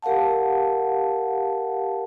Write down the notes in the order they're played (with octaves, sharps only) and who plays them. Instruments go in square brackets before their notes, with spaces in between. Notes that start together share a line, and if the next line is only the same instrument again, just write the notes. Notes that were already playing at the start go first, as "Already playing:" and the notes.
[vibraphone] G4 A#4 F5 F#5 A5